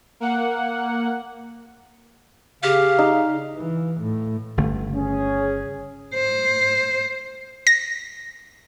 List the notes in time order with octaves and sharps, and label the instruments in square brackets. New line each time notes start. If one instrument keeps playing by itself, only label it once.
[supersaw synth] A#3 F#5
[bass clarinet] C#3 [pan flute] G4 [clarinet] F5
[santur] D#4
[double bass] E3
A2
[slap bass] G1 C#3 A3
[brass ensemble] C#4 G#4
[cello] C5
[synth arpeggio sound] A#6